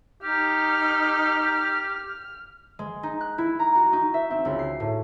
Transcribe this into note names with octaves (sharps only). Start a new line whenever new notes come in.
D#4 G4 F6
G#3
D#4
F#6
E4
A#5
F#4
D#4
E5
C4
C#2
C7
A2